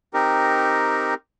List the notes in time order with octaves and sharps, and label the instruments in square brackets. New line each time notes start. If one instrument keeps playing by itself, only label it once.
[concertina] C4 D#4 G4 A#4